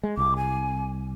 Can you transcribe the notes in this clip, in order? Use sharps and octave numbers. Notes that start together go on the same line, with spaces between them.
G#3
C2 D6
G#5